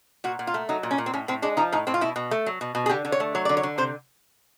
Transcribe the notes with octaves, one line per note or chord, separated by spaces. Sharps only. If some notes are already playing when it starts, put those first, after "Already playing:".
A#2 F#4
A#2
F4
A3
F#3 D#4
A#2
C#4
A#2
C4
A2 C#4
A2 C4
G#3 D4
F3 D#4
A2 D#4
A2 C4
F4
B2 E4
B2
A3
F#3
B2
B2
G#4
D3 G4
D3
C#5
A3
F#3 C#5
D3 D5
C#5
D3
C3 C5